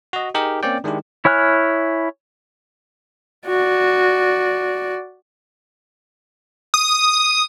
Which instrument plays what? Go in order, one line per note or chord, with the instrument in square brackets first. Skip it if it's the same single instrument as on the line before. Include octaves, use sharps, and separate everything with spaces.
[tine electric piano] F#4 D#5
D#4 G4 G#4 A#4
A#3 C4 C#4 D5 G5
D#3 G#3 D4 E4 G4
[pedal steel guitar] E4 C#5 G#5 F6 F#6
[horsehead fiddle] F#4 D5
[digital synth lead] D#6